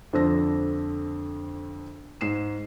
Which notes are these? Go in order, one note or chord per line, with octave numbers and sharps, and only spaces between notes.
F2 D3 D4 C5 E6 A#6
G#2 C7 E7